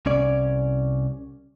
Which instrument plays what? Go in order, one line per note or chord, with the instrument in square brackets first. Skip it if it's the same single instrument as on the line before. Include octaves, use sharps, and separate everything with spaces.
[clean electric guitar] C2 C#4 D5